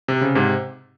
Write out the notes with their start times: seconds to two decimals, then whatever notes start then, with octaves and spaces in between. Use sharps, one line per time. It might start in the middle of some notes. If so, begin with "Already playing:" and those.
0.08 C3
0.21 C#3
0.35 G#2 C3